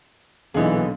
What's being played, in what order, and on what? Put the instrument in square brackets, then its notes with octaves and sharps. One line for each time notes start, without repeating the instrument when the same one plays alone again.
[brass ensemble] B1 [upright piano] A#2 D3 [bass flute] E3 [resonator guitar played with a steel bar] B3 D#4 G#4